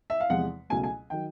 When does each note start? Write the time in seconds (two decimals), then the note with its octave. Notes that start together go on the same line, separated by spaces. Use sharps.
0.10 E5
0.20 F5
0.30 E2 C3 F3 G#3 F#5
0.70 C#2 B2 F#3 A3 G#5
0.83 G#5
1.10 D#3 F#3 G5